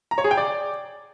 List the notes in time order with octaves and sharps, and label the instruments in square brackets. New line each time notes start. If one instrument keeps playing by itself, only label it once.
[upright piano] A#5
C#5
G#4
G5
D5